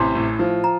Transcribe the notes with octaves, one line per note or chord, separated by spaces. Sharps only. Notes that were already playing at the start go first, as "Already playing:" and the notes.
Already playing: A1 C3 C6
A2
F3
A#5